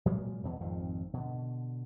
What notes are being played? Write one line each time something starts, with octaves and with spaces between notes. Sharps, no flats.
A#2 F#3 G#3 A#3
E2 B2 E3
G#1 F2 D#3 C4
B2 D3